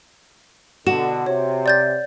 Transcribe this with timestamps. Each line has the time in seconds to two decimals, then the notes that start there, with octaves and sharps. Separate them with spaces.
0.87 B2 D3 F#4 E7
1.26 C3 C#5
1.66 D5 G6 A6